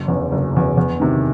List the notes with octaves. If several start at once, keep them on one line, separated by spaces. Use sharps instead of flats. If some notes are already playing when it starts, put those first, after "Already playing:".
Already playing: F#1
E2 C#3
F#1
E2 C#3
E2
C3 D#3